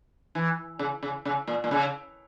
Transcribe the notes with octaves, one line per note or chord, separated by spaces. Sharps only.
E3
C#3
C#3
C#3
A#2
A#2
C#3